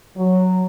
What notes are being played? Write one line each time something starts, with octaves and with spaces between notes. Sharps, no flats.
F#3